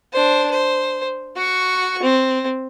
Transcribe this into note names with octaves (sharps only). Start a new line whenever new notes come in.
D4 C5
C5
F#4 C#6
C4